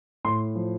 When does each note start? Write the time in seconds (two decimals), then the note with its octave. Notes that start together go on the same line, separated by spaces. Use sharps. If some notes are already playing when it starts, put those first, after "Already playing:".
0.25 A2 C6
0.55 F3